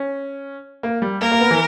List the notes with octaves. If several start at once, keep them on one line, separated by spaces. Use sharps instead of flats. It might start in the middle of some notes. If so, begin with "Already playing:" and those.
Already playing: C#4
A#3
G3
A#3 A#4
A#3
B3
E3